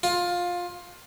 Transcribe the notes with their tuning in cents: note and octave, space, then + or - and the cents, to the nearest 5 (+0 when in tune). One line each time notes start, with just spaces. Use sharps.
F4 +15